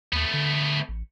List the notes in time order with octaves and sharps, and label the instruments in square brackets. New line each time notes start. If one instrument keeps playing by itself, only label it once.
[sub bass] D#2 [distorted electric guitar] A3 B3
[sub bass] D3
A1